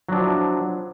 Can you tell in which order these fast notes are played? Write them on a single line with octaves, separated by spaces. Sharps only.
F#3 D4 F3 E4